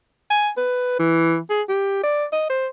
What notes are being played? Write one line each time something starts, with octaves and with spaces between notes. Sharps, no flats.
G#5
B4
E3
G#4
G4
D5
D#5
C5